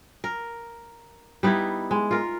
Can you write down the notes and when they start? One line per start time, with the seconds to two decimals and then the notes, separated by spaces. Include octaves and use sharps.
0.24 A#4
1.43 G3 B3 D#4 E4
1.91 G#3
2.11 F4 A#4